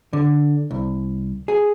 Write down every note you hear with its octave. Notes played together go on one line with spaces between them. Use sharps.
D3
C2
G#4